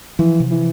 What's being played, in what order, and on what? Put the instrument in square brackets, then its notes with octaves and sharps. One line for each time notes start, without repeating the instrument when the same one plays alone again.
[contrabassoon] E3 [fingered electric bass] F3
[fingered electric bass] C3
[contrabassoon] E3